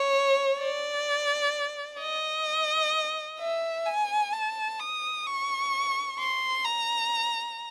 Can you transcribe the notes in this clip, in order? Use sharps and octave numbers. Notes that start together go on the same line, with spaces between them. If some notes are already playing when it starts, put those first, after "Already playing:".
Already playing: C#5
D5
D#5
E5
G#5
A5
D#6
C#6
C6
A#5